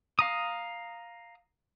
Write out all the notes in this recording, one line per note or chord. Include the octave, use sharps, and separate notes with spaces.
F5 A#5 D#6